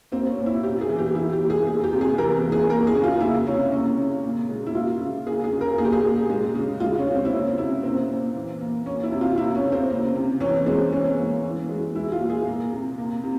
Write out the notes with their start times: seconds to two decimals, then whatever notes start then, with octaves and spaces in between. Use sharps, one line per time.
0.12 A#3 C4
0.29 C#4
0.38 A#2
0.46 E4
0.63 A#3 G4
0.81 G#4
0.89 E3
0.98 G4
1.15 E3 E4
1.33 G4
1.41 A#3
1.50 G#4
1.66 A#3 G#4
1.84 G4
1.92 C3
2.01 G#4
2.18 E3 A#4
2.44 A#3
2.52 G#4
2.69 A#3 A#4
2.87 G#4
2.95 C#3
3.04 F4
3.21 A#3 E4
3.47 C3 C#4
3.72 A#3 C#4
3.98 C#3
4.23 A#2
4.49 G#3
4.67 E4
4.75 A#3 F4
5.01 C#3
5.27 A#3 G#4
5.44 G#4
5.52 C#3
5.61 A#4
5.78 A#3 G#4
5.85 G4
5.92 G#4
6.04 A#2
6.30 G#3
6.55 C#3
6.80 G#3 F4
6.98 C#4
7.07 C#3
7.15 C4
7.25 E4
7.32 A#3 C#4
7.58 C3 E4
7.83 A#3 C4
8.09 A#2
8.36 E3
8.61 A#3
8.86 A#3 C#4
9.03 E4
9.12 C3
9.21 F4
9.38 A#3 E4
9.55 C#4
9.64 C#3
9.72 C4
9.90 A#3
10.15 C3
10.40 E3 C#4
10.66 G#3 C4
10.93 E3 C#4
11.18 A#3
11.44 E3
11.69 G#3
11.95 G#3 E4
12.12 F4
12.21 A#2
12.30 G#4
12.47 A#3
12.72 C3
12.98 A#3
13.23 C3